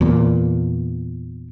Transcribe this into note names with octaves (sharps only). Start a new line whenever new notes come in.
E2 A#2